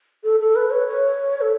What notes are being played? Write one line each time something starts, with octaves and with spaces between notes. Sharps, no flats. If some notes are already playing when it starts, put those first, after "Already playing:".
A4
A4
B4
C#5
C#5
A4